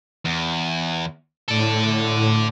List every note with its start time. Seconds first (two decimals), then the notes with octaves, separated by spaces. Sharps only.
0.25 E2
1.48 A2 A4 D5